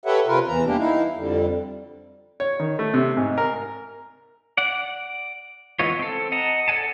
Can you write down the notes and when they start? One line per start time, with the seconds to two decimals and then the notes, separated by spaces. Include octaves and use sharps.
0.06 G4 A4 B4 C#5 E5 F#5
0.27 C3 F4 A#4 B4
0.48 E2 E3 A#5
0.66 G3 A#3 D4 G4
0.78 D#4 E4 F5
1.17 F2 D3 G3
2.40 C#5
2.60 D#3
2.79 A3
2.94 C3
3.17 G#2
3.38 A#4
4.57 D5 F#5
5.79 E3 G#3 B3 F4 C#5
5.99 C4 A4
6.32 D#5 F#5 A5 A#5
6.68 A4 D5 F#5 G#5 A5